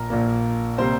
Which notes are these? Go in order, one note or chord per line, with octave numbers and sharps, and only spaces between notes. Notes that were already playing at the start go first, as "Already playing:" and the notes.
Already playing: A#1 A#2 A#3 A#4
A#1 A#2 A#3
C3 G3 A#3 C5 C6